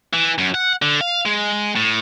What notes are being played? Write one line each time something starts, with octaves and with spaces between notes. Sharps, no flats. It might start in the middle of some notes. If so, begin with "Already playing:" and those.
E3
F#2
F#5
D3
F5
G#3
A2